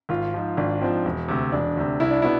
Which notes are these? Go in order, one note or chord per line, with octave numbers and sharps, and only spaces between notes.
G#1 F4
G#2 F3
G#1 D4
G#2 F3 C4
E1
D2 C3
E1 D4
D2 C3
C2 E4
D4
B2 B3 E4